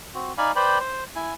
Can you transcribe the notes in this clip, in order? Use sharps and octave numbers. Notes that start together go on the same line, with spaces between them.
C4 F#4
D#4 D5 F5 G#5 B5
B4 C5 D5 G5 B5
C5
E4 G#5